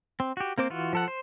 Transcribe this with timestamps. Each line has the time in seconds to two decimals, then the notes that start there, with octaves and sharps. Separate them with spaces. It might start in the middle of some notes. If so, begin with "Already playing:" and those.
0.20 C4
0.37 F#4 G4
0.58 A#3 C4 C5 D6
0.70 E3 F4 F#4
0.93 F3 A4 F#5
1.08 C5